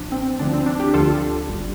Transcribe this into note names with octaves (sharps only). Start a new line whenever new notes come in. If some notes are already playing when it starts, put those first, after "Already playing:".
Already playing: A1 A2 F3 D4
C4
D2 D3 F3 D4
C4
D4
D4 G4
D2 D3 F3 F4 A4
G1 G2 G3